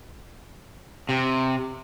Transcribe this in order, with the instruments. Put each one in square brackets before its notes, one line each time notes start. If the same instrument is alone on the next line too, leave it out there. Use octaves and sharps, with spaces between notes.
[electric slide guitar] C3